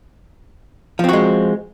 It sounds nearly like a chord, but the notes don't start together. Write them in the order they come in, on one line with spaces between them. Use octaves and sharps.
F3 C4 F#4 G#3